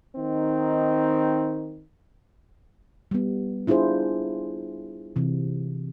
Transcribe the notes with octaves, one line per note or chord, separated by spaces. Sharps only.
D#3 C4 D#4
G3 B3
D4 E4 F4 G#4 C5
C3 E3